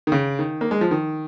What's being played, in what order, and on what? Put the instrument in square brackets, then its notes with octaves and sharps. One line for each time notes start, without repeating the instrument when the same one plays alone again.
[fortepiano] D#3
C#3
D#3
A#3
G#3
F3
D#3